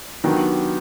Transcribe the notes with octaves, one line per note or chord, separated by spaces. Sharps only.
D#3 F#3 B3 D4 G4